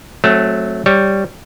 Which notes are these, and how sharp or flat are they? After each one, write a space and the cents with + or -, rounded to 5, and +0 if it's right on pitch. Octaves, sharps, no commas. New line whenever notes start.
F#3 +0 A3 +0 C4 +30
G3 +0 C#5 +0